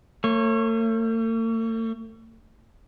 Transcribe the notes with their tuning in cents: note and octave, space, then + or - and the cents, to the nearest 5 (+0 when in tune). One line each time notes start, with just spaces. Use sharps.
A3 +45 C#5 -25